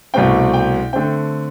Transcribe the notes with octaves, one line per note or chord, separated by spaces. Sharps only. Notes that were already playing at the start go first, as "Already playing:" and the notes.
C2 B2 A3 C4 G5
G5
D3 A3 C4 G5